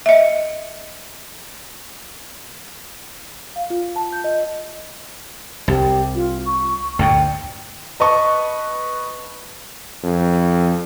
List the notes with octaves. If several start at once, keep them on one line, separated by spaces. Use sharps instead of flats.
D#5 E5
F5
F4
A5
G6
D#5
C2 G4
F4
C#6
D2 G2 A#2 G5
B4 D#5 A5 C#6
F2